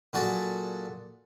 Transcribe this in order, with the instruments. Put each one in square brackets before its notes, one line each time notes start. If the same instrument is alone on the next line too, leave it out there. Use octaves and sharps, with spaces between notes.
[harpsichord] A#2 F#3 D4 F#4 G#4 A4